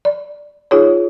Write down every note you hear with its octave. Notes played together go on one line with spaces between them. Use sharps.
D5
D#4 F4 G#4 C#5